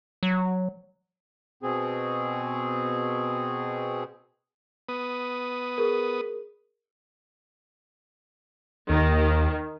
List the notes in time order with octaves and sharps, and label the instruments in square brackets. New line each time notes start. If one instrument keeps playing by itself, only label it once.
[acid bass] F#3
[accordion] B2 C4 G#4
[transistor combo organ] B3 B4 D#6
[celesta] G#4 A#4
[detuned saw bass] D#2 [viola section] D#3